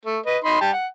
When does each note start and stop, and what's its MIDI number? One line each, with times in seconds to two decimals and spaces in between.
0.05 0.19 57
0.26 0.38 71
0.26 0.38 75
0.44 0.57 63
0.44 0.57 83
0.44 0.57 84
0.61 0.71 55
0.61 0.71 67
0.61 0.71 81
0.73 0.87 78